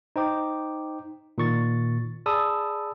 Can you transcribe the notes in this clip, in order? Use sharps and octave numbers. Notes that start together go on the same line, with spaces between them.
D#4 C5 G5 D6
A#2 D#3 C#6 A6
G#4 D5 A5 B5 D#6 E6